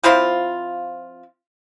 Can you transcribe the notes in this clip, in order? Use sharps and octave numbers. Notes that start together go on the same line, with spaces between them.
F3 C4 E4 F4